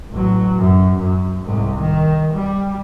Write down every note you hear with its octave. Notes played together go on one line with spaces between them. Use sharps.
A1 F#3
F#2
F#2
C2 G#2
D#3
G3